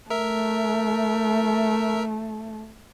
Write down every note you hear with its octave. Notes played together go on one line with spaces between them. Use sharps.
A3 A#4 E5